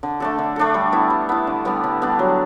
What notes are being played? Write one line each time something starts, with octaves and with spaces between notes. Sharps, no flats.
D3
A3 D4 A4
D3
A3 D4 A4
G3
B3 E4
G3
B3 E4
D3
G3 B3 D4
D3
G3 B3 D4
F#3